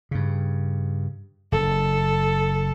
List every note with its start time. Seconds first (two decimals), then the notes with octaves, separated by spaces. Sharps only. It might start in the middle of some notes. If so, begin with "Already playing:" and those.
0.11 G2 C#3
1.52 F#1 A4